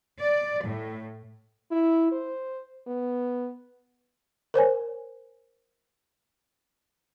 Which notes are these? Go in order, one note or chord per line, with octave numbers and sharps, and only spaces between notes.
D5
A2
E4
C5
B3
A#4 C5 C#5 G#5